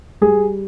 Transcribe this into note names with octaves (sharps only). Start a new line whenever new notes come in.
G3 G#4